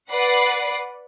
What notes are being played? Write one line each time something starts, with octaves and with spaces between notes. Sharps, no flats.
B4 D5 F#5 C7